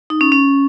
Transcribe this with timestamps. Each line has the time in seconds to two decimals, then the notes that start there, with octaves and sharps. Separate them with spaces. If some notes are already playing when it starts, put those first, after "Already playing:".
0.10 D#4
0.21 C#4
0.32 C#4